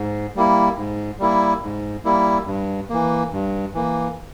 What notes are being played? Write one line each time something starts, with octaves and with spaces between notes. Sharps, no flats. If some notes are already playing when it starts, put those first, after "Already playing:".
Already playing: G#2
G3 A#3 E4
G#2
G3 A#3 E4
G#2
G3 A#3 E4
G2
E3 A#3
G2
E3 A#3